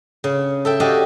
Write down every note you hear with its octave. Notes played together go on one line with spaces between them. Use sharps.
C#3
A4 E5 G5
F#4 G4 D5 D#5 F5